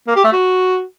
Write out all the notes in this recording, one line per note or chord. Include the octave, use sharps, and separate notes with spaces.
A#3
G4
A3
F#4